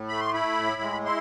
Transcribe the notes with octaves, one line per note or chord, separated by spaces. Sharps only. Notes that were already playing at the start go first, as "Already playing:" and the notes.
Already playing: A2
A3 B5
C6
E4 B5
A2
G#3
E4 C6